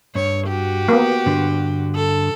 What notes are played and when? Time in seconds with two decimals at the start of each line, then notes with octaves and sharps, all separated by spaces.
0.15 G2 C#5
0.48 F#4 G4
0.89 A#3 B3
1.26 G2 D3
1.96 A4